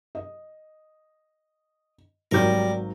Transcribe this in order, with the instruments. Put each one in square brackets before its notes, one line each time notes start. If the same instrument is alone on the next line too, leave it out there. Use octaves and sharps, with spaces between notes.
[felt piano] D#5
[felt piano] G#1 F#3 G6 [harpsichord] G3 A#4